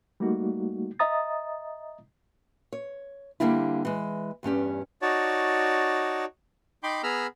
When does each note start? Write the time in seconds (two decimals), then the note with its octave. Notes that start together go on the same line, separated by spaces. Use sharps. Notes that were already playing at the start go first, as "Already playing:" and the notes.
0.20 G3 A3 A#3 D#4 F#4
0.99 D#5 E5 A#5 D#6 A6
2.73 C#5
3.40 D3 G3 A#3 C4 D4 E4
3.85 E3 G#3
4.43 E2 G2 C#4 G4
5.02 D#4 F#4 C#5 D5 A5
6.83 D#4 G5 B5 C6 D6 G6
7.03 B3 G#4 A#5 B5 E6 F6